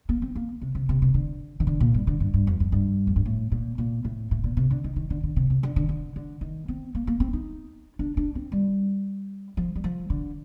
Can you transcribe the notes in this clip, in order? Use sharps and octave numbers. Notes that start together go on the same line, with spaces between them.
A#3
C4
A#3
C3
C3
C3
C3
D3
D#3
D3
A#2
G2
D3
G2
G2
F2
F2
G2
F2
G2
A2
A#2
A#2
A2
A2
A#2
C3
D3
D#3
D#3
D3
D3
C3
C3
D3
D3
D3
D3
D#3
C4
A#3
A#3
C4
D#4
D4
D4
C4
G3
F3
G3
F3
D3